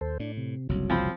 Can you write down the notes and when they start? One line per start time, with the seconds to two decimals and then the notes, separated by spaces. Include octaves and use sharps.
0.01 D#2 A4 C5
0.20 A2 D4
0.37 C3
0.69 F#1 C2 F#3
0.90 F3 C4 B5